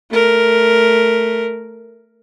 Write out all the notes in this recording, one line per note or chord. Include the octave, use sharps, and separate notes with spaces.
A3 A#4